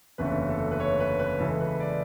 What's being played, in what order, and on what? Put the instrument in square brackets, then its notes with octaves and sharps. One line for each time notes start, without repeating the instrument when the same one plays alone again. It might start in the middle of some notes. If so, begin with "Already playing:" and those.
[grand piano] F#1 E2 D3 A3 C#4 B4
A4
B4
C#5
B4
B4
C#2 C#3 E3 A4
B4
D5